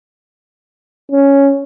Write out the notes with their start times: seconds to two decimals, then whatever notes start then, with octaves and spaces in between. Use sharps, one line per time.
1.11 C#4